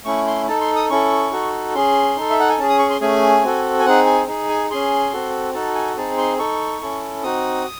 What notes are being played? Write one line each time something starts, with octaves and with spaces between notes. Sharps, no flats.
A3 C#4 E4 C#6
C6
D#4 A4 A5
C6
D#6
C#4 E4 A4 C#6
D#4 F#4 A4
C#4 G#4 C6
D#4 A4
E5
F#5
G#5
C#4 G#4 A5
D#6
C#6
C6
A3 C#4 G#4 G#5
C4 F#4 A4
G#5
C4 D#4 G#4 F#5
G#5
D#4 G#4
G#5
C#4 G#4 C6
C4 F#4 A4
D#4 F#4 A4 A5
G#5
C4 D#4 G#4 A5
C6
D#4 A4 C#6
C#4 E4 A4
C4 D#4 F#4 D#6